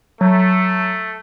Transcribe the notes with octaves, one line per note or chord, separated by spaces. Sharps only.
F#3 A3